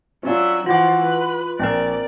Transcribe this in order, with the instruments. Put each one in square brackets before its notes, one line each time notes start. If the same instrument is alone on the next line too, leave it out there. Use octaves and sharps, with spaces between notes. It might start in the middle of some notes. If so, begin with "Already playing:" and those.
[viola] F#3 E5 [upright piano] C#4 D4 F4
[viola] E3 F3 [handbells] F4 D6 [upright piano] F#4 F#5
[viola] B4
[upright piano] A#1 [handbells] C4 A#4 [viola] D5